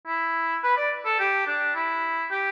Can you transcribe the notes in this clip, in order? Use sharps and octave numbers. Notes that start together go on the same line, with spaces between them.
E4
B4
D5
A4
G4
D4
E4
G4